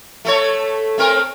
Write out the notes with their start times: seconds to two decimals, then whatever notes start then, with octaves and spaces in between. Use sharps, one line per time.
0.25 A3 A4 C#5
0.98 A3 C4 A#4